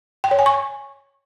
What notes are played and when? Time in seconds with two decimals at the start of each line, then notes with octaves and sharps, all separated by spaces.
0.24 G5
0.31 C#5
0.39 G#5
0.46 C#6